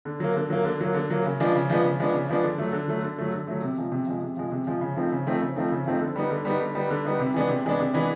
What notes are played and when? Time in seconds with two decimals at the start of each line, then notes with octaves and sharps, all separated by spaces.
0.05 D3
0.20 F#3 A#3
0.36 D3
0.50 F#3 A#3
0.65 D3
0.80 F#3 A#3
0.94 D3
1.10 F#3 A#3
1.25 C#3
1.40 F3 G#3 B3 D4
1.55 C#3
1.70 F3 G#3 B3 D4
1.84 C#3
2.00 F3 G#3 B3 D4
2.14 C#3
2.29 F3 G#3 B3 D4
2.43 D3
2.58 F#3 A3
2.73 D3
2.88 F#3 A3
3.03 D3
3.18 F#3 A3
3.33 D3
3.47 F#3 A3
3.62 C3
3.78 F3 G#3
3.92 C3
4.07 F3 G#3
4.22 C3
4.37 F3 G#3
4.52 C3
4.67 F3 G#3
4.81 C#3
4.96 F3 A3 C4 D#4
5.12 C#3
5.26 F3 A3 C4 D#4
5.41 C#3
5.56 F3 A3 C4 D#4
5.71 C#3
5.86 F3 A3 C4 D#4
6.01 D3
6.16 G3 B3 D#4
6.31 D3
6.45 G3 B3 D#4
6.61 D3
6.75 G3 B3 D#4
6.90 D3
7.05 G3 B3 D#4
7.19 C3
7.34 E3 G#3 B3 D4
7.49 C3
7.65 E3 G#3 B3 D4
7.79 C3
7.94 E3 G#3 B3 D4